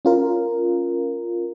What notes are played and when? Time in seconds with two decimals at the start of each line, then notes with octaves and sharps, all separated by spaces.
0.05 C#4 F4 A#4